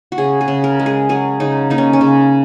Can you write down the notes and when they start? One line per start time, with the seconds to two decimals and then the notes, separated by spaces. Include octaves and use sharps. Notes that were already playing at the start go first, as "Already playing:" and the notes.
0.12 F#4
0.18 C#3 G#4
0.41 G#4
0.48 C#3
0.64 A#4
0.79 G#3
0.86 G#4
1.09 F#3 G#4
1.40 C#3 D#4
1.70 A#3 D#4
1.78 C#4
1.93 C#4
2.01 C#3